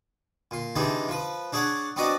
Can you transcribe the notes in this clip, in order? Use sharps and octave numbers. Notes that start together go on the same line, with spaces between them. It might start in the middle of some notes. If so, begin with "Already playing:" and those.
A#2 C6
C3 E3 D4 D#4 G#4
F3 B4
D4 G#4 C#5 F#5 D6
B3 C4 D4 F#4 D5 D#5